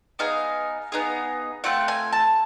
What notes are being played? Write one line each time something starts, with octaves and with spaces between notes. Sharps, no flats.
B3 D#4 G#4 F5
B3 D#4 G#4
A3 C4 F4 F#5
G#5
A5